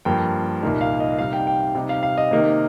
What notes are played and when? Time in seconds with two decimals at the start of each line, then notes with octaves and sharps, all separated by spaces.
0.05 G2 F3 A#3 G5
0.62 C2 A#2 A#3 D#4
0.81 F5
1.00 D#5
1.18 C3 G3 D#4 F5
1.33 G5
1.47 G5
1.75 C3 G3 D#4
1.89 F5
2.03 F5
2.18 D#5
2.31 C3 D#3 A#3 D#4